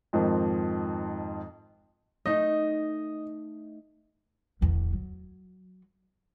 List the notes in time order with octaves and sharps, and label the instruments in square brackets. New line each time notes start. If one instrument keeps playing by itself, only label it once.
[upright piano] F2 G#2 D#3 F3
[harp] A3 D#4 [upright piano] D#5
[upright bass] D1 E2
F#3